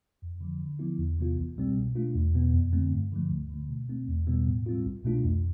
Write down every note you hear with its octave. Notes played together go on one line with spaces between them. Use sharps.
F2
D3 F3
D3
F3 B3 E4
E2
C3 E3 B3 F4
C2
B2 G3 C4
B2
A3 D4 F4
E2
B2 B3
F2
D3 A3 C4
G2
D3 F3 A3
D2
D3 A3
B2
A3 C4
E2
B2 G3 B3
A2
G3 C4 F4
C2
B2 A3 D4 F4
F2